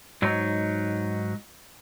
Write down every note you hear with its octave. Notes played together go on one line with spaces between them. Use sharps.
G#2 F#3 D#4